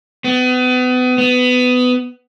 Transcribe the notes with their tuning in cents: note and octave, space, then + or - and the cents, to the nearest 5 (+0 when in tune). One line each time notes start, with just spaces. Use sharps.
B3 +35
B3 +20